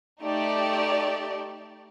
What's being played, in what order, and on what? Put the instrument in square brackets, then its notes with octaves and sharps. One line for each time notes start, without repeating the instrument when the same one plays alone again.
[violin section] A3 D#4 G4 D5